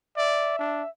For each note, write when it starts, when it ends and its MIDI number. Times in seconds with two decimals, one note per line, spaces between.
0.16 0.55 74
0.16 0.88 76
0.59 0.83 62